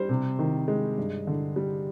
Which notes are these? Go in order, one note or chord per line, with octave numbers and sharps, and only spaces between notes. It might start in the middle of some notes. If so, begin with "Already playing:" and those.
Already playing: G3 C5
C3
D#3
G#3
G2
D3
G3